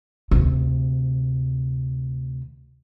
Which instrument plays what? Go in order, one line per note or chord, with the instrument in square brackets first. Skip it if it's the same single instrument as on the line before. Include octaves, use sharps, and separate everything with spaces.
[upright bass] D2 C3